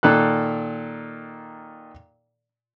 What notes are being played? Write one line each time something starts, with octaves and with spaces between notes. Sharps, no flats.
A#2 D#3 A4 F#6